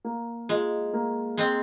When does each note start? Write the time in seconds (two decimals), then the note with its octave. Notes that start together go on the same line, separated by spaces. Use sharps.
0.05 A#3
0.49 G#3 F4
0.94 A#3
1.37 G#3 C4